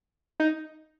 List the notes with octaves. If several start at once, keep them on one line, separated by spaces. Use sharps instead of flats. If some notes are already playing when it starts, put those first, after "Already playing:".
D#4